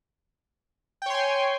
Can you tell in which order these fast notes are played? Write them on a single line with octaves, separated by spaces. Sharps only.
G5 C#5 C6 G#5